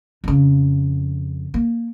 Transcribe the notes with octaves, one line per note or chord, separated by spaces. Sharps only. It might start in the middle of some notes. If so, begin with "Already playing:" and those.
F2 C#3
A#3